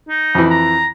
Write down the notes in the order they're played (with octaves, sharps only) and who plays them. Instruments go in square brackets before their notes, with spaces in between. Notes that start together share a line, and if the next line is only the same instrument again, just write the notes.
[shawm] D#4
[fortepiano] F2 E3
[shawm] A#5